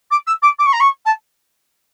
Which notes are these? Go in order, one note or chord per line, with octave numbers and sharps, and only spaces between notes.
D6
E6
D6
D6
C#6
A#5
C#6
A5